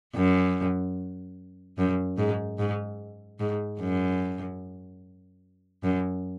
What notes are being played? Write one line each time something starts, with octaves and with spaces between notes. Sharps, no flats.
F#2
F#2
G#2
G#2
G#2
F#2
F#2